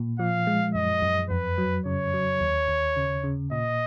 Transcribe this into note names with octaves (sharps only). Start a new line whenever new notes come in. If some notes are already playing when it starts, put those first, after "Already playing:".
Already playing: A#2
F3 F5
G#3
F#2 D#5
F#2
F2 B4
F#3
C#3 C#5
F#3
D#2
D#2
C#3
C#3
A#2 D#5